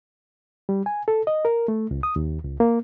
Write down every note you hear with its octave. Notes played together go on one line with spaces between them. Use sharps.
G3
G#5
A4
D#5
A#4
A3
C#2
D#6
D#2
C#2
A#3